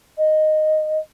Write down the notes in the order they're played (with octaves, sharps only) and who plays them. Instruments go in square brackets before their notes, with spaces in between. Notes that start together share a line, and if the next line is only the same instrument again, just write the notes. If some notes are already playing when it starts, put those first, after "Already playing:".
[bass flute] D#5